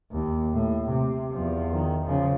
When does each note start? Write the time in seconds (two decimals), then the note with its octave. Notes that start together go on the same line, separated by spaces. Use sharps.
0.11 D#2
0.53 A2
0.88 C3
1.32 E2 F3
1.74 D#3
2.05 C#3 F3